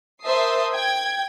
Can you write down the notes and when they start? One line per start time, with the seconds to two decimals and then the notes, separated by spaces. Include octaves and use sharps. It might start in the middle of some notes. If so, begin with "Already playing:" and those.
0.22 A#4 C5 E5 A5 D#6 C7
0.73 G5 G#6